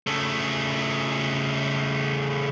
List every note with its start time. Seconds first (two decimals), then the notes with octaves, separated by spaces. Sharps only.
0.07 C#3 A3